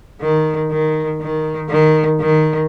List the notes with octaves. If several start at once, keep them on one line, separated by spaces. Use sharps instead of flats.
D#3
D#3
D#3
D#3
D#3